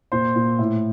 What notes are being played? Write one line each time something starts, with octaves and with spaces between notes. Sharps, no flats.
A#2 C5 C6
A#2
A2